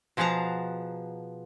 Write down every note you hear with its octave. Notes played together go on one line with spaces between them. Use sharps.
B2 F3 G#4 F#5 A5 A#5